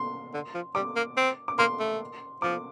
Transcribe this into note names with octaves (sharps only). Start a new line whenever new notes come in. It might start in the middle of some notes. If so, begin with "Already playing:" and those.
Already playing: C6
D3
F3
G3 D6
A#3
C4
D6
A#3 C6
A3
F3 D6